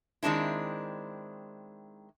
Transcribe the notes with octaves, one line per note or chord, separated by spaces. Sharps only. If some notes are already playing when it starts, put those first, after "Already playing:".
D#3 G#3 C4 D4 E4